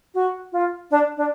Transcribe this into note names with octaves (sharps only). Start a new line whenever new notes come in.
F#4
F4
D4
D4